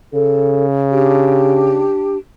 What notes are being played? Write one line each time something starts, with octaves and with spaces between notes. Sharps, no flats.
C#3 A4
D4 G4